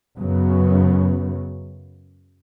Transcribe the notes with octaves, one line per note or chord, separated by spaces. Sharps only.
F#2 C#3 F#3 B3